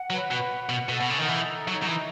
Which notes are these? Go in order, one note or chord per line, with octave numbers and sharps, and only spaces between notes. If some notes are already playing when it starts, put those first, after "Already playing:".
Already playing: F#5
F#3 B4
B2
F#5
F#5
B2
B2 A4
B2
C#3
D#3 D#4
E3
A4
F#3 D#4
F#3
E3
E5